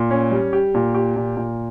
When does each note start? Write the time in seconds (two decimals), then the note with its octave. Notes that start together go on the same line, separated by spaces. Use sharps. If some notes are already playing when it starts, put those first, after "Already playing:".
Already playing: A#2
0.11 C#4
0.31 G3
0.53 G4
0.75 A#2
0.94 G4
1.16 A#2
1.37 A#2